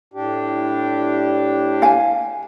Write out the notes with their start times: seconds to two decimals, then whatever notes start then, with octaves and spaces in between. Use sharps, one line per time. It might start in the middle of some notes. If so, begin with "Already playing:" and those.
0.14 A2 D4 G4
1.82 F5 G#5